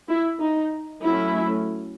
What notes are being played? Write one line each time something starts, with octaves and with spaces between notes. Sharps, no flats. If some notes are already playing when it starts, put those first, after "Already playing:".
E4
D#4
F#3 A3 C#4 E4